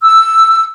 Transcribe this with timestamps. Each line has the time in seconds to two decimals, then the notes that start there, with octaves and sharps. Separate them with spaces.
0.03 E6